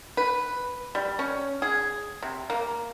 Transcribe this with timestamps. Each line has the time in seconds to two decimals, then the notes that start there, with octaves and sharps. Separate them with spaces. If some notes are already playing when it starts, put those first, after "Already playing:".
0.17 B4
0.95 G3
1.19 C#4
1.62 G#4
2.22 C3
2.50 A#3